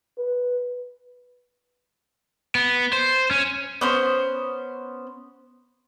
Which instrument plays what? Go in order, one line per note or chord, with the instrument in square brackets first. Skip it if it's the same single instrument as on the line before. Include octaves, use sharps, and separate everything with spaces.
[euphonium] B4
[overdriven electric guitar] B3
C5
C#4
[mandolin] B3 C#4 C5